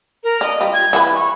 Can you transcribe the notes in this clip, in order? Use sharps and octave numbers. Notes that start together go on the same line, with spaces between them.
A#4
D4 D#5
G3 F4
G#6
E3 F#4 B4
C#6